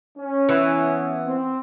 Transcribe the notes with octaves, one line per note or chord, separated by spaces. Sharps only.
C#4
E3 B3
C4